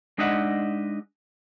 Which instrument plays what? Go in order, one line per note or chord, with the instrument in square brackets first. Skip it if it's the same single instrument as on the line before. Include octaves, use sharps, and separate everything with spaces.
[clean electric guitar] G#3 D4 D#4 D#5 E5 F#5